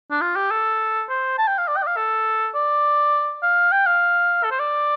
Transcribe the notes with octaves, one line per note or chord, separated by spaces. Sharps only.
D4
F4
G4
A4
C5
A5
G5
F5
D5
G5
D5
F5
A4
D5
F5
G5
F5
A4
C5
D5